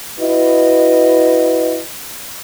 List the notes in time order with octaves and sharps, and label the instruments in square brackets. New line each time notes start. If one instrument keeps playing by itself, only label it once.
[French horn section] E4 F#4 B4 D#5